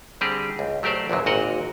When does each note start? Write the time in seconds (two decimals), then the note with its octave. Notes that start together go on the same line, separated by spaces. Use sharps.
0.21 D3 G3 C4 G4 G#4
0.59 C#2
0.83 F#3 A3 G4 A#4 C5 D5
1.09 A#1 E2 D3 F#3
1.26 G#1 A#2 F#4 A#4 D#5 F#5